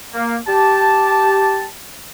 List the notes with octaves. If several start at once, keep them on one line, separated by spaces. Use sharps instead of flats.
A#3
G4 A5